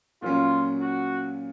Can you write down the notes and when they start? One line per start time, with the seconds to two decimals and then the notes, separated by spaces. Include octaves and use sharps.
0.22 A#2 F#3 C#4 F4
0.81 F#4